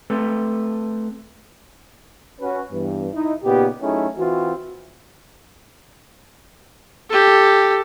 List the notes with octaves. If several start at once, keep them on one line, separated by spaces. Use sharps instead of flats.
A3 C4 A4 B4
C#4 F#4 B4
G2 E3 B3
D#4 E4
A#2 C#3 B3 D#4 G4
F#3 A3 C#4 D#4 E4 G#4
E3 C4 F4 F#4
G4 A4